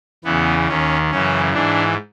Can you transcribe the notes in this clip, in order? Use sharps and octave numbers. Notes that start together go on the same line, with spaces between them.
E2 C#3 E3 B3
D#2 D#3 C#4
F#2 C#3 E3 C#4
G#2 E3 D4